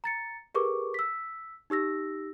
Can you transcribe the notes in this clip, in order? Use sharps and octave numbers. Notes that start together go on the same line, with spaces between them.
A#5 A6 C#7
G4 G#4 A#4 B4 C#6 D6
E6 B6
D#4 G4 E6 A#6